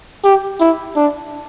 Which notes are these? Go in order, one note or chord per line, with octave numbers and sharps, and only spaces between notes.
G4
E4
D4